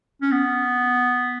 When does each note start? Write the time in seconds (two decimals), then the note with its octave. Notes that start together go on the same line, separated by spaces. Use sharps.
0.22 C#4
0.32 B3